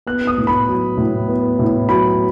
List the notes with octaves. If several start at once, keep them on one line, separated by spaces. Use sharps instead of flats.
B3 F#6
D#6
A2
B5
F#3
A2
B3
A2
F#3 B5